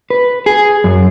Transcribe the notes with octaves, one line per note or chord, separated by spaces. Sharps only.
B4
G#4
F#2